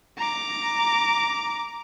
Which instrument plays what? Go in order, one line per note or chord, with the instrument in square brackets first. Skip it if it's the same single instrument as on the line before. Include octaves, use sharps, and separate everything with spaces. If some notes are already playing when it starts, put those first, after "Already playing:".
[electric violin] A#5 D6